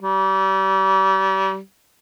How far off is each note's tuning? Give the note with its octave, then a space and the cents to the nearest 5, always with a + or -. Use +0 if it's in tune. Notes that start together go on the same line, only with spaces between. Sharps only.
G3 -35